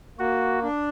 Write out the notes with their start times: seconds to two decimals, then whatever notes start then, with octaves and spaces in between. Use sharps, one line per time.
0.19 A#3 F#4
0.63 D4